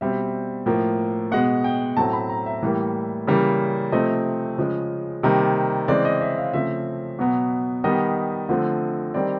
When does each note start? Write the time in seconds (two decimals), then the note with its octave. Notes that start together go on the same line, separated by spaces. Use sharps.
0.01 B2 G3 C4 E5
0.66 A2 F3 A#3
1.31 B2 G#3 B3 F#5
1.64 G5
1.97 A2 F#3 A3 C4 A5
2.13 B5
2.29 A#5
2.46 E5
2.62 A2 E3 G3 A#3
3.27 C#3 E3 G3 A#3
3.92 C3 F3 A3 C4 D#5
4.58 C#3 F3 G#3
5.23 C3 D#3 G3 A#3
5.88 C#3 E3 G#3 C4 D5
6.05 D#5
6.21 E5
6.37 F5
6.53 C#3 F3 A3 C4 E5
7.19 B2 F#3 B3
7.84 D#3 G3 B3 D#5
8.49 D3 F3 A3 C4
9.14 D#3 G3 C4 D5